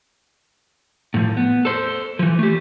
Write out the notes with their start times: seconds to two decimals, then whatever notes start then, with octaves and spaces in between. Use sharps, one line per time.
1.14 A2 F3
1.37 B3
1.65 A4 C5
2.19 E3 F3
2.39 A3 G4